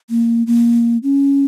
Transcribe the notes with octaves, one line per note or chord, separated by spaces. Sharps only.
A#3
A#3
C#4